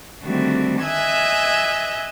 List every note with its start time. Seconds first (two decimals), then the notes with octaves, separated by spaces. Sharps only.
0.22 D3 D#3 G3 A3 C4 F#4
0.81 D#5 E5 G#5 E6 F#6 G#6